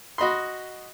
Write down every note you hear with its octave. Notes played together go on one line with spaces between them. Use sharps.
F#4 D#5 B5 C6